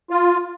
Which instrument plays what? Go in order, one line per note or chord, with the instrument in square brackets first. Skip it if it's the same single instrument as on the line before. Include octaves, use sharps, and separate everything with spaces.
[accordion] F4